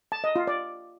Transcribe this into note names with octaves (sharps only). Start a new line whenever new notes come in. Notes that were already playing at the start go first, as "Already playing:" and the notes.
A5
D#5
F4
D5